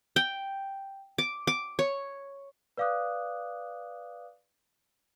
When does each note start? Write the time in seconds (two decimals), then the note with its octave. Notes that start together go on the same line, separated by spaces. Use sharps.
0.16 G5
1.18 D6
1.47 D6
1.79 C#5
2.77 B4 D5 F5 D6 D#6 F#6